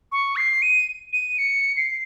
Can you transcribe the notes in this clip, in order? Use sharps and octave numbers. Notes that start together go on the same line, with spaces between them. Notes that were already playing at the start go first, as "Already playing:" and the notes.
C#6
C7
D#7
D#7
C#7
C7